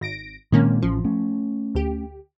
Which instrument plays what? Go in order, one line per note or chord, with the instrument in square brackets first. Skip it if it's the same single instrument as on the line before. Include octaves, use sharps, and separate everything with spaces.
[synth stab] G#1 A#6 D7
[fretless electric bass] A#2 G#3 C4 [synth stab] D#3 A#3 C#4
[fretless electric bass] A1 C#4 [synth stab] F3
[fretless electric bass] A3 C#4
[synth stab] D2 G4